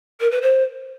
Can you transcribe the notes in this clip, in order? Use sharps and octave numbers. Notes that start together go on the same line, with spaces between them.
A#4
B4
C5